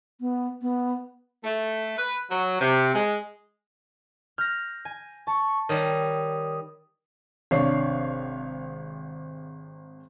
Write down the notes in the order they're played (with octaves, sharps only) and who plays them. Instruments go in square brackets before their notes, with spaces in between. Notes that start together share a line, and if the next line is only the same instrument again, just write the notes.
[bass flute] B3
B3
[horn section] A3
B4
F#3
C3
G#3
[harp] F6 [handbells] G6 A#6
[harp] G#5
[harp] A5 [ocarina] C#6
[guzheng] D#3 G3 [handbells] A#4 C#5 [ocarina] D#6
[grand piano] G#1 C3 D4 C#5 F5 C7